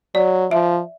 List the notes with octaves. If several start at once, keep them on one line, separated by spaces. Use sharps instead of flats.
F#3 D5
F3 E5